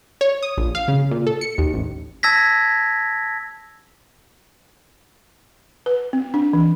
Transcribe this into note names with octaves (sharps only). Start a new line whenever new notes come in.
C#5
D#6
A#1
F5
C#3
A#2
A4
C#7
D#2
A1
A5 E6 G#6 A#6 B6
B4
C4
D4
E3